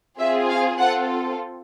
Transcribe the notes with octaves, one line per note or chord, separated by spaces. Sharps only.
C4 F4 G#4 E5
F5
C4 F4 A4 F#5